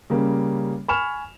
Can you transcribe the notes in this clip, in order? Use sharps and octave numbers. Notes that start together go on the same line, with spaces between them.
C#3 G3 A#3
G#5 B5 C#6 F6 E7 F7